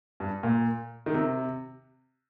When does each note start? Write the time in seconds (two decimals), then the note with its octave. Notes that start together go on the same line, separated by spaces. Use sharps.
0.20 G2
0.43 A#2
1.06 D#3
1.14 C3